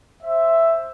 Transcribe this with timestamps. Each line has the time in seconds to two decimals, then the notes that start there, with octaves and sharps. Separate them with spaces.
0.23 C5 E5